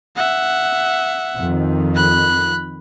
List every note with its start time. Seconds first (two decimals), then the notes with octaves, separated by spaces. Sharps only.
0.16 E5 F#5
1.37 F2 D#3
1.95 B5 F#6